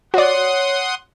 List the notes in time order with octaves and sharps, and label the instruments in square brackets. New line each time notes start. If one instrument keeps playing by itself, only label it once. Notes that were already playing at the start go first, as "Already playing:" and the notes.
[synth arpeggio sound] F#4 D5 [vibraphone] C#5 [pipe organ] F#5 C6 D#6